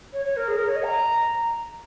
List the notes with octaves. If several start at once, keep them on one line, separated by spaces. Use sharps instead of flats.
C#5
C#5
A#4
G#4
A#4
C#5
D#5
A#5